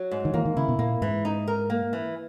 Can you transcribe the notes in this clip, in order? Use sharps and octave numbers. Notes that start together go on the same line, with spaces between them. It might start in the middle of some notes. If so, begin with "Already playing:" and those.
Already playing: F#3
G#2
D#3
E3 A#3
D#3
C#3 E4
B2
A#2 A#3
G#2 E3
D#4
A#4
A#3
E3